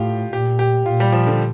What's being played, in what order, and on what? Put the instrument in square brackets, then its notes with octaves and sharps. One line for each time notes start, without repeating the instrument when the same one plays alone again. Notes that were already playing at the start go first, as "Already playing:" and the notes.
Already playing: [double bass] A2 [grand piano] F4 G4
[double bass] A#2 [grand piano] G4
[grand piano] G4
[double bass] A#2 [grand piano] F4
[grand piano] G3
F3
D3